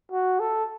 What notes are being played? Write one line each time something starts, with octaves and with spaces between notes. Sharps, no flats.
F#4
A4